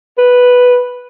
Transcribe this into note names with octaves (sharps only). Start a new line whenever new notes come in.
B4